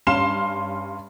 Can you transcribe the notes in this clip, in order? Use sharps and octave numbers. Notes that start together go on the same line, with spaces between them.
G2 C#4 F5 C6 C7 E7